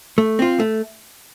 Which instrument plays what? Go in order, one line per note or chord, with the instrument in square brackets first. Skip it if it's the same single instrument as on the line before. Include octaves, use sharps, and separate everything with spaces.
[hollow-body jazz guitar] A3
C4 F4
A3